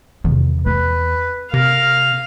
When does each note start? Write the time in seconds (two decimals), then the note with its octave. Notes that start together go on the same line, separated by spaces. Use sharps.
0.24 E2 C3 D#3
0.66 C4 B4
1.54 C3 A#4 F5